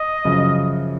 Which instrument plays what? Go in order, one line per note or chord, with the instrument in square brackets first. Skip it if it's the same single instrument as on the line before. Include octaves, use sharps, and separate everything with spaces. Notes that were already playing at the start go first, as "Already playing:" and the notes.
Already playing: [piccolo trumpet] D#5
[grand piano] F#2 C#3 F3